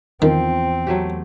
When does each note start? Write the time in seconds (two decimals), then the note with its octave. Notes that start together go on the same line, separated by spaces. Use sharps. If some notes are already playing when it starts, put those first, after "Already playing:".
0.22 E2 D#3 F3 C4
0.87 F#3 A3 G4